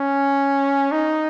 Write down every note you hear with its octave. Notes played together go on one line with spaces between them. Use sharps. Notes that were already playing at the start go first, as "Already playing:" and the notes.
Already playing: C#4
D#4